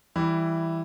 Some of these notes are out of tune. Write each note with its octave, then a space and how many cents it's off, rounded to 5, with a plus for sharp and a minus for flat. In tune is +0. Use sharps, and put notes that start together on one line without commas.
E3 +0 G3 +0 E4 +0